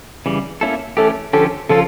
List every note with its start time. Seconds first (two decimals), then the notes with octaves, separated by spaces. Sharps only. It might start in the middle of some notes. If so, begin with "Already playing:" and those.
0.26 C#3 E3 G3
0.61 A#3 C#4 E4 A4
0.97 E3 A3 C#4 G4 A4
1.33 D3 F3 C#4 G4 A4
1.69 C#3 F3 C#4 F4 A4